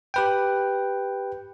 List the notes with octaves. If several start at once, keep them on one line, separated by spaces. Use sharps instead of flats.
G4 B4 G5